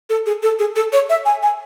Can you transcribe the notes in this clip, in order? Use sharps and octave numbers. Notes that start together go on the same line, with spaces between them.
A4
G#4
A4
G#4
A4
C#5
E5
G#5
G#5